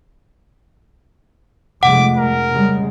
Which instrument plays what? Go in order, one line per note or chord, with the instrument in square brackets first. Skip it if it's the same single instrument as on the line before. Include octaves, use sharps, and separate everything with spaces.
[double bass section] F1 G#3 A3 [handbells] F#5 [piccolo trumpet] D6
[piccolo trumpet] A#4
[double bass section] C#3 G3 G#3